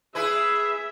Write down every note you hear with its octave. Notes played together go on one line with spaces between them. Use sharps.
E4 G#4 B4 E5